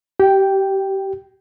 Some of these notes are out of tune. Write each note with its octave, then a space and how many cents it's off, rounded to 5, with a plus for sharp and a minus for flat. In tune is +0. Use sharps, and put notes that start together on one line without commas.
G4 -25 G5 +0